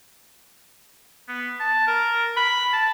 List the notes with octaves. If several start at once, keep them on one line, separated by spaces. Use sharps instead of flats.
B3
A5
A#4
B5
A5